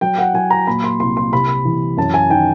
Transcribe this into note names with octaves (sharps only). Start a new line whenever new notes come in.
F#3 G5
F#5
F#3 G#5
A#5
A#2 B5
C6
C2 C6
C6
C3 B5
E3
F#2 A5
G#5
D#3 G5